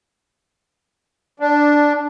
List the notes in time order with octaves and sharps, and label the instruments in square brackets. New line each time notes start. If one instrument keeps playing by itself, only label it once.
[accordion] D4